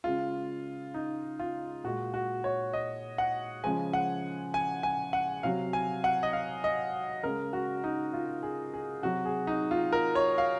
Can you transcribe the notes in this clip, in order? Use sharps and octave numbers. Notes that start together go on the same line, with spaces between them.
C#3 G#3 F4
D#4
F4
A#2 G#3 F#4
F#4
C#5
D#5
F#5
C#3 F3 G#3 G#5
F#5
G#5
G#5
F#5
C3 F#3 F5
G#5
F#5
D#5
F5
D#5
C#3 G#3 A#4
F#4
D#4
F4
G#4
G#4
C3 F#3 F#4
G#4
D#4
F4
A#4
C#5
F5